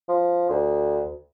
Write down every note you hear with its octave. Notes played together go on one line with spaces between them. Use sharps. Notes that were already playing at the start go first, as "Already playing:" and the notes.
F3
D2